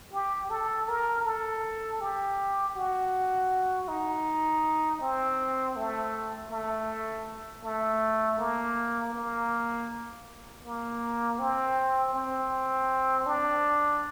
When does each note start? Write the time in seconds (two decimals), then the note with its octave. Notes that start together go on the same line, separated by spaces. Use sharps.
0.12 G4
0.50 A4
0.88 A#4
1.25 A4
2.01 G4
2.76 F#4
3.88 D#4
5.01 C4
5.76 A3
6.51 A3
7.63 A3
8.39 A#3
9.13 A#3
10.63 A#3
11.39 C4
12.14 C4
13.26 D4